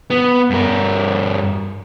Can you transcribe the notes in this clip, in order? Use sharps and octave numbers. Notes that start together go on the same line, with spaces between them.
B3
G2 A#4